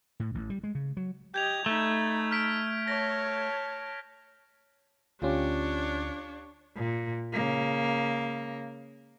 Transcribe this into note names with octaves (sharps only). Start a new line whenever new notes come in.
A2
A1
G3
G#3
C#3
F#3
G4 D#5 G6 G#6 F7
A3 D#4 B5
F6 B6 D7
C#5 A5 A#6
D2 C#4 D4 F4 G4 C#5
A#2
C#3 A#3